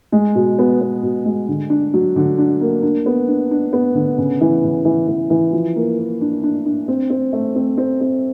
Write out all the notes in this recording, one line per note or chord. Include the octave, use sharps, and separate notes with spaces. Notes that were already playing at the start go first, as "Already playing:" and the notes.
G#3
B2
B3
B3
B2
G#3
D3
D4
F#3
D3
D4
A#3
D4
B3
D4
D4
B3
D3
C#3
E3
C#3
E3
E3
E3
F3
A#3
A#3
D4
D4
D4
C4
C4
A3
C4
C4
C4